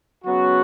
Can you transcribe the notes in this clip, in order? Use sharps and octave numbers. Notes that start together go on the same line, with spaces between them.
C#3 F#3 B3 F#4